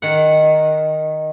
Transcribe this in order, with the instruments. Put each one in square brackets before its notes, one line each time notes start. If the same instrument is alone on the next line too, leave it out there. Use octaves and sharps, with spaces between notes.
[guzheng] D#3 F#5